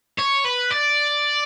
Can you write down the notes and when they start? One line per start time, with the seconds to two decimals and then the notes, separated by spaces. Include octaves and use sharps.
0.19 C#5
0.46 B4
0.71 D5